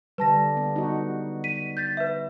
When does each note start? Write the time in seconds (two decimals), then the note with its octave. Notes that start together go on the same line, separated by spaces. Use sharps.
0.18 D3 G3 B4 A5 A#6
0.57 B3
0.76 D#4 F#4
1.44 B6 D#7
1.77 G6 A6 B6
1.97 B4 E5